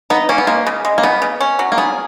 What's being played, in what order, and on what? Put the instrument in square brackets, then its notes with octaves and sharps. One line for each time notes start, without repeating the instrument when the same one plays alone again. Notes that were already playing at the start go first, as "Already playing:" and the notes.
[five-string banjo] B3 [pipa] D#4
[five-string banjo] A#3 [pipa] C#4
[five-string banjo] B3
[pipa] G#3 [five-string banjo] A#3
[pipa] C#3
G#3
[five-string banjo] A#3
[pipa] C#3 [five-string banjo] B3
[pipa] C#3
C#4
F#3
[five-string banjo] A#3
[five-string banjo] B3 [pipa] G#4